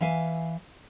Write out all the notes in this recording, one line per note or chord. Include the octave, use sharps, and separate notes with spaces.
E3 E5 F5 G#5